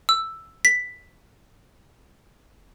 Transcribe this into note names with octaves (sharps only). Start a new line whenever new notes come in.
E6
B6